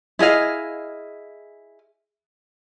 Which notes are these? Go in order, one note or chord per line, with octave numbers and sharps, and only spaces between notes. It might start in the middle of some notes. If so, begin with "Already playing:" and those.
E4 G#4 D#5 F5